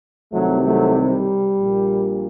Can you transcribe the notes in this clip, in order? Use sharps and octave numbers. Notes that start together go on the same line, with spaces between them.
C2 C3 D#3 F#3 A3
F#3 A3
G3
A#1 A#2